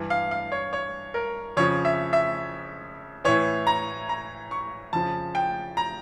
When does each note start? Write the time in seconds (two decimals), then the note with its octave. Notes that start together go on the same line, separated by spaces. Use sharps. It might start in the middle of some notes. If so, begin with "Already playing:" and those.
Already playing: G2 E3
0.10 F5
0.31 F5
0.52 C#5
0.73 C#5
1.14 A#4
1.57 F2 C#3 F3 C#5
1.85 E5
2.13 E5
3.25 A2 E3 C#5
3.67 A#5
4.09 A#5
4.51 C#6
4.93 F2 C#3 F3 A5
5.35 G5
5.77 A#5